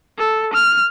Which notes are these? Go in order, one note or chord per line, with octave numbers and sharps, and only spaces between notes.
A4
F6